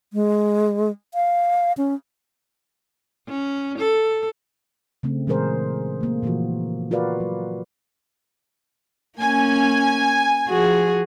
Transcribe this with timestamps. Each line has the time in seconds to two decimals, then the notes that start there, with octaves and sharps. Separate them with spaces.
0.13 G#3
1.14 F5
1.77 C#4
3.28 C#4
3.78 A4
5.03 C#3 A3 C4
5.27 A#2 E3 G#3 G#4 A#4 C5
6.01 A3 A#3
6.22 A#2 E3 F3 F4 F#4
6.91 F4 F#4 A#4 B4 D5 F5
7.20 F#3
9.19 A#3 C#4 G#5
10.48 F3 F#4 G#4